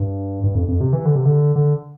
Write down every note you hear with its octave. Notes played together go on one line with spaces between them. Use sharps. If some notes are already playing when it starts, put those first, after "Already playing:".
Already playing: G2
G2
F2
F2
C3
E3
D3
C3
D3
D3